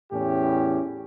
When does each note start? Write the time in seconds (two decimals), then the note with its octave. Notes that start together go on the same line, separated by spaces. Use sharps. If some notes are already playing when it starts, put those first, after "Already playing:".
0.12 E2 A2 C#4 G4